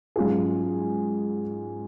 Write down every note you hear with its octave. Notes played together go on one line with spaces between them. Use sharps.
G#2 F#3 C#4 F4 G#4